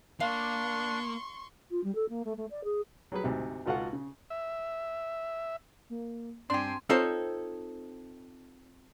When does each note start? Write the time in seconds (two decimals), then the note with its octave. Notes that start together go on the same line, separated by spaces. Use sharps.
0.20 A#3 D4 F5 C6 C#6
1.71 F4
1.84 G3
1.95 A4
2.09 A#3
2.25 A3
2.37 A3
2.51 D5
2.64 G#4
3.12 F#3 G3 G#4 B4
3.24 D2 G#2 C3
3.66 G#1 C#2 F4 F#4 A4 F#5
3.93 C#3
4.30 E5
5.90 A#3
6.50 G2 C4 D4 G4 G#5 C6
6.89 C4 D#4 F4 A4 C5 C#5